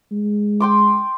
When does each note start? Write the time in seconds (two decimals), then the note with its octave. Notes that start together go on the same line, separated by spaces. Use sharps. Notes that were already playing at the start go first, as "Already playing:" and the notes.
0.12 G#3
0.60 G5 C6 D6